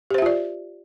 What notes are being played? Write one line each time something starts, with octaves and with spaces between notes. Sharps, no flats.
F4 G4 C5 D5 E5